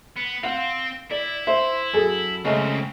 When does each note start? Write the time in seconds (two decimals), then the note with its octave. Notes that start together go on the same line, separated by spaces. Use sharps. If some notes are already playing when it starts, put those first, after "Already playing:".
0.17 B3
0.43 C4 F5 F#5
1.11 E4 D5
1.47 C5 E5
1.94 F#2 G#4 A4
2.45 F#2 C#3 G#3 A3 C4